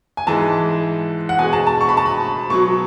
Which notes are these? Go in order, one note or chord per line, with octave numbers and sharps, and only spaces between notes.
G#5
G#2 E3 G#3 A5
F#5
B2 G#3 G#5
A5
A5
C#6
B5
A5
B5
B2 F#3 C#6